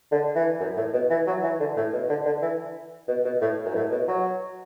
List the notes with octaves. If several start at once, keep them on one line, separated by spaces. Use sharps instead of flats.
D3
E3
F#2
A2
B2
E3
F#3
E3
D3
A2
B2
D3
D3
E3
B2
B2
A2
F#2
A2
B2
F#3